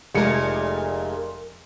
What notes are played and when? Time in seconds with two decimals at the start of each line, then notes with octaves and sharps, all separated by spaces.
0.14 F1 A#2 G#3 A3 A#4 C#7